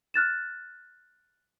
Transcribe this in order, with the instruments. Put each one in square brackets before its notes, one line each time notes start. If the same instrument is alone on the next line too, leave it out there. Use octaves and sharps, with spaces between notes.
[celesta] F6 F#6 A6 E7